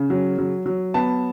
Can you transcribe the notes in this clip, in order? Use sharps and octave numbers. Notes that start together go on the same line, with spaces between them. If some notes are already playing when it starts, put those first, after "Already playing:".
Already playing: C#3
F#3
F#3
F#3
B3 A5